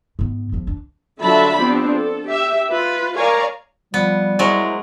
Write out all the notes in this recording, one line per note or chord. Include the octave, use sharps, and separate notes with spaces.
G#2 B3
E2 F3
D4
D3 F#3 F4 E5 A5 B5
F3 B3 C4 D4 G4
A4
G4 E5
F4 B4
A#4 C#5 D5 F5 G#5 A#5
F3 G3 B3
F#3 G#3 E4 A#4 C5